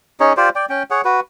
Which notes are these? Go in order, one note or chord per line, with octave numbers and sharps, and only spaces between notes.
C#4 D#4 G#4 C#5
F4 G4 C5 D5
D5 G5
C#4 G5
G#4 C#5 F#5
F#4 B4